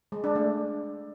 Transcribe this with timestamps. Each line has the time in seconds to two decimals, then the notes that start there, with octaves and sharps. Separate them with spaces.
0.12 G#3
0.24 D4
0.35 A3